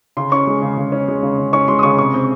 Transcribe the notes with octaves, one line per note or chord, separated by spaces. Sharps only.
C#3 C6
C#4 C#6
G#3
C#3
C#3
C#4
G#3
C#3
C#3
C#4 C#6
G#3 C6
D#6
C#3 C#6
C3 C#6
C4